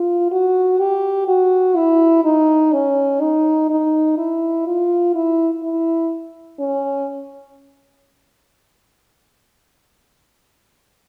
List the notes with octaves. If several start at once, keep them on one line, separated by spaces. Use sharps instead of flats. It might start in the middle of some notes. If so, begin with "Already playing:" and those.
Already playing: F4
F#4
G4
F#4
E4
D#4
C#4
D#4
D#4
E4
F4
E4
E4
C#4